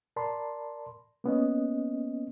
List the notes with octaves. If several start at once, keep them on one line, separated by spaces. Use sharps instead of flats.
A#4 D5 A5 B5 C6
A#3 B3 C#4 D#5